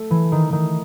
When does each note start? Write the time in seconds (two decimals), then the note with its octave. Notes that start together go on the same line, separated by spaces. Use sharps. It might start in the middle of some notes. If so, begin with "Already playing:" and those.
Already playing: A3
0.11 E3
0.32 D#3
0.53 D#3